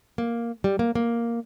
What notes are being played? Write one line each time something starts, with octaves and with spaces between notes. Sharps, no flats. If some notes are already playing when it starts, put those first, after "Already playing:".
A#3
G3
A#3
A#3